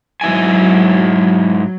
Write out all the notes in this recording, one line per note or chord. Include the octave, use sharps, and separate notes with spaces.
G#2 F#3 E4 G#5